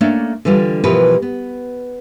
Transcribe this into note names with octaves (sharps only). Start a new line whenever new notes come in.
A3 A#3 C#4 D4 C#5 D5
D3 E3 G3 F4
B2 E3 F3 G4 A#4 B4
B3